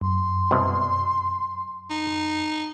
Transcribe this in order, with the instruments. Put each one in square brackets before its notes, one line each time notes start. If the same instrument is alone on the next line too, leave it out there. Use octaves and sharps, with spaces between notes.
[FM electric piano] F#2 [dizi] C6
[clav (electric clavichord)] C2 B2
[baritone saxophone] D#4